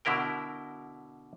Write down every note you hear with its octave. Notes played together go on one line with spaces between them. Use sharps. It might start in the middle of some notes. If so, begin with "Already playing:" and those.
B2 D3 E4 A#4 G5